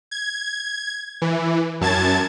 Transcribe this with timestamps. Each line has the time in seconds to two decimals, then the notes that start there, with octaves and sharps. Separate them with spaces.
0.11 G#6
1.22 E3
1.81 F#2 A5 G#6 A6